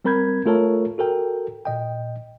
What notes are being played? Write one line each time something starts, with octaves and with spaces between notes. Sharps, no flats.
G3 C4 A#4 B5 G6 G#6
A3 F4 A4 A#4 C#5 A5
F#4 A4 A#4 G5
A#2 D#5 G5